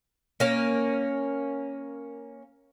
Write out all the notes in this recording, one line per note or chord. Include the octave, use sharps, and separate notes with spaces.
A#3 C#4